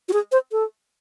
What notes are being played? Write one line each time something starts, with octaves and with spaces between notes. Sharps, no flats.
F#4
G#4
C5
A4